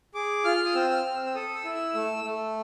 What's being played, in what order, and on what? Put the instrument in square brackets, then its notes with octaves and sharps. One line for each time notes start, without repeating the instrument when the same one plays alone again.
[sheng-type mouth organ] G#4 D6
F4 F6
D#6
C4 E6
E6
F6
C4
E6
E6
A4 D#6
E6
E4
E6
A3 E6
A3